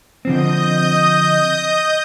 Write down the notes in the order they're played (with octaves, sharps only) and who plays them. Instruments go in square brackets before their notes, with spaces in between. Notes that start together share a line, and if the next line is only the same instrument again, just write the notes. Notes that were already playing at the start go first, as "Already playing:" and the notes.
[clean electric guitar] D3 F3 C4 [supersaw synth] D#5 D#6 G6